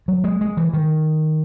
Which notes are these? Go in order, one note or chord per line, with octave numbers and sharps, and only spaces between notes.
F#3
G#3
G#3
E3
D#3